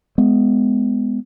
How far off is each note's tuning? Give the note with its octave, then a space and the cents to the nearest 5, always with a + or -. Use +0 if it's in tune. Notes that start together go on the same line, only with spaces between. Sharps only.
G#3 +10 B3 +25